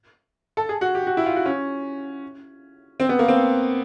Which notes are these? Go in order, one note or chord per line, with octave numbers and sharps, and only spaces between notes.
A4
G#4
F#4
G4
F#4
E4
F4
F#4
C#4
C4
B3
A#3
C4